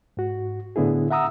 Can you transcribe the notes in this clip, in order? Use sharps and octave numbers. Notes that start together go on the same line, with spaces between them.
G#2 F#4
A2 D3 B3 E4 G#4
E5 F#5 A#5 D#6 E6